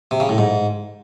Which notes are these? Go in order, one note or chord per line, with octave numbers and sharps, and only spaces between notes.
C3
C#3
A2
G#2